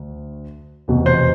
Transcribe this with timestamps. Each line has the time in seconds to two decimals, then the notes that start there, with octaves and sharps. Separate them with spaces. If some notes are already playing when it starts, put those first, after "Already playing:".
Already playing: D2 A3
0.88 F1 E2 B2
1.06 C5